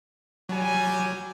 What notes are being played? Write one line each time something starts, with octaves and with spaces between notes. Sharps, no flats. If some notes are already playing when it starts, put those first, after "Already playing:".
F#3 G3 G#5